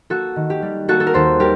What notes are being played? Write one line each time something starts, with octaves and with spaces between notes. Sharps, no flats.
A#3 F#4 A4
D#3
G4
G3
A#3 F#4 A4
A4
A#4
D#2 A4 C5
G3 G4 A#4